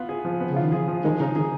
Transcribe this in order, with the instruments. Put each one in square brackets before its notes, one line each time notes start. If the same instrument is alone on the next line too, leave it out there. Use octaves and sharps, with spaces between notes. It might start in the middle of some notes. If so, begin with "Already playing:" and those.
Already playing: [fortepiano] B3 F4
G#4
F3
B3
[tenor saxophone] C#3
[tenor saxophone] D#3 [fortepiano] F4
[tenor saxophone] F3 [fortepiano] G#4
[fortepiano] F3
[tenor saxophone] D#3 [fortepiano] G#3
[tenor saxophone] C#3 [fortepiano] D#4
[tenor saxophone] D#3 [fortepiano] G#4